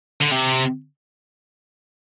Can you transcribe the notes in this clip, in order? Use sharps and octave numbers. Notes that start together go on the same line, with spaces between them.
D3
C3